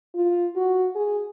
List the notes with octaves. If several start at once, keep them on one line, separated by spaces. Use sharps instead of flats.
F4
F#4
G#4